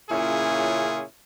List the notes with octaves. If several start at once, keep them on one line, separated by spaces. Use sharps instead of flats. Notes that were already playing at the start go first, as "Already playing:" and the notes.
A#2 C#3 C#4 E4 F4 G#4